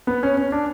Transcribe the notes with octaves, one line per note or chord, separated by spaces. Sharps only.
B3
C#4
C#4
D4